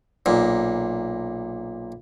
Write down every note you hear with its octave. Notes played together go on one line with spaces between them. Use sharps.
B1 A#2